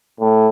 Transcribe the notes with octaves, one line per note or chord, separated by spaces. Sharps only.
A2